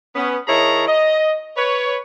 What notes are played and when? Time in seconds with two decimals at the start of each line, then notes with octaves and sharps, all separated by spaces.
0.15 B3 C#4
0.47 D#3 E4 G#4 C#5 A5 A#5
0.88 D#5
1.57 B4 C#5